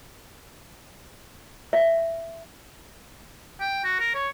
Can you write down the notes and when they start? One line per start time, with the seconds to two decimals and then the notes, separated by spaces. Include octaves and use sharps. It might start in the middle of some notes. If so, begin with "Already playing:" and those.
1.73 E5
3.60 G5
3.84 F#4
3.99 A#4
4.14 C#5